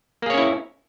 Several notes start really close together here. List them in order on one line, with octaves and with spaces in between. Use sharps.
A#3 G#4 C#5 C#4 E4